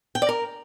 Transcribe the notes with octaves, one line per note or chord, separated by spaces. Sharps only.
G5
D5
A#4